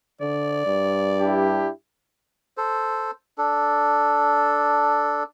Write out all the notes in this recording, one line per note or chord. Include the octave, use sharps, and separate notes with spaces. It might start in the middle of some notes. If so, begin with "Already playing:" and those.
D3 D5
G2
D4 E4 G4
A4 C5
D4 A4